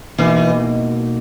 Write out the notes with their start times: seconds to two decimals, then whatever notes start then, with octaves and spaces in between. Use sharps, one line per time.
0.18 B2 E3 A#3 D#4 F#4